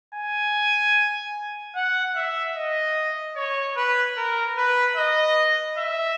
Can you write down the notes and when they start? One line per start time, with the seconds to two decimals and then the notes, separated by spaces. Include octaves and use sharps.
0.15 G#5
1.76 F#5
2.16 E5
2.56 D#5
3.36 C#5
3.77 B4
4.17 A#4
4.57 B4
4.96 D#5
5.78 E5